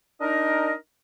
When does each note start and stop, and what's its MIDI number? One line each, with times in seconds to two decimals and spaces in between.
0.21 0.73 62
0.21 0.73 63
0.21 0.73 70
0.21 0.73 75